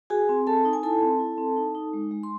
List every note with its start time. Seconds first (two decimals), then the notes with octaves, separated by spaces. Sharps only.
0.10 F#4 G#4 G#5
0.29 C4
0.47 C4 A4 A5
0.65 D#4
0.73 G#5
0.83 E4 A4 A5
1.02 C4
1.20 E4
1.38 C4
1.56 D#4
1.75 D#4
1.93 G#3
2.11 G#3
2.23 C6